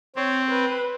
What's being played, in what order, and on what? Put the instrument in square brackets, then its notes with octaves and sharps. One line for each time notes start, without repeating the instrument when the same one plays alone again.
[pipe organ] C4 [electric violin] C#5
[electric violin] B4